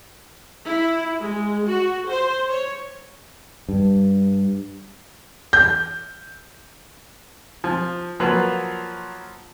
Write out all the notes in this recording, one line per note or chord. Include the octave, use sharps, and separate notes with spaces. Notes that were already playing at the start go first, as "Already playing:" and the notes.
E4
G#3
F#4
C5
C#5
G2
G6
F3
F3 F#3 A#3 F4 B4